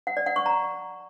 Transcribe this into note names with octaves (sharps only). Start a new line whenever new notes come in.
F#5
D5
F#5
C#6
A#5